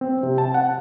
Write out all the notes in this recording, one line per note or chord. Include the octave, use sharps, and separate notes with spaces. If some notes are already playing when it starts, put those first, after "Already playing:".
C4
C3
A5
F#5